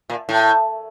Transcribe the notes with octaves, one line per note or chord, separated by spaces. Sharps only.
A#2
A2